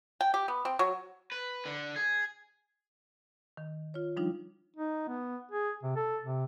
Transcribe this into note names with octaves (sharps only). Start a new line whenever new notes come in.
G5
G4
B3
C4
F#3
B4
D3
G#4
D#3
F4 C#5
F3 G3 D4 D#4 F4
D#4
B3
G#4
C3
A4
C3